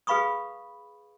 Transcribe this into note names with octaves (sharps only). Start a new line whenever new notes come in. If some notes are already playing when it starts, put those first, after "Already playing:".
G#4 B4 F5 B5 C#6 D#6